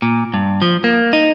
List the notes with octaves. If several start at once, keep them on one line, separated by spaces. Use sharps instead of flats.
A#2
G2
F3
A#3
D#4